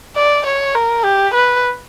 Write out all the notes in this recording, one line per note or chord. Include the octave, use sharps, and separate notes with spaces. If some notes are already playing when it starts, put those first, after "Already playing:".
D5
C#5
A#4
G4
B4